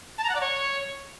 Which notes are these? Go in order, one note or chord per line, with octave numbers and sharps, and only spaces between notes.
A5
A#5
F#5
D5
C#5